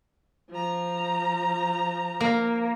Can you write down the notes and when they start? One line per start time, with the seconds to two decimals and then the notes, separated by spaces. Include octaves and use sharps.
0.50 F3 A#5
2.20 A#3